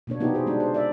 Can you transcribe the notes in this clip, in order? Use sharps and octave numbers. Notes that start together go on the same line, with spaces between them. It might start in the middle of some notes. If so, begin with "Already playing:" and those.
B2 A#3 D4 C#5
C3 B3 D#4 E4 G4
G#4 C5
G#3 D4 D#4
C5
D5 E5